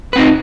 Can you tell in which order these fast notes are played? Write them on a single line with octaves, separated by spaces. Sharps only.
B4 C4 D#4